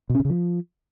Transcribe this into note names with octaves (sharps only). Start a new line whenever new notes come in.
B2
C#4
C3
C#3
F3